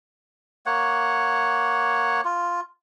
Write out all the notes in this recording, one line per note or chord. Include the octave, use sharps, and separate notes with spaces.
A#3 C#5 F#5
F4